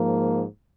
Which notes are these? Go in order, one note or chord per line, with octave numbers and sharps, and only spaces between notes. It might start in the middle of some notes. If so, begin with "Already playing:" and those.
Already playing: G#2 F3 A#3